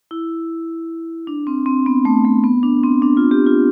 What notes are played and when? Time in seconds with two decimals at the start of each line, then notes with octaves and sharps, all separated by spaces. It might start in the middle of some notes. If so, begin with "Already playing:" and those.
0.11 E4
1.27 D4
1.47 C4
1.66 C4
1.86 B3
2.05 A3
2.25 A3
2.44 B3
2.63 D4
2.84 C4
3.02 D4
3.17 F4
3.31 G4
3.47 F4